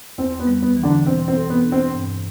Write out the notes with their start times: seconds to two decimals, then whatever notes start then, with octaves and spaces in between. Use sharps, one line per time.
0.18 E2 C4
0.40 B3
0.47 G3
0.62 B3
0.77 E3
0.83 D3 D4
1.06 B2 C4
1.28 C4
1.36 A4
1.50 B3
1.64 D4
1.72 C4
1.93 G2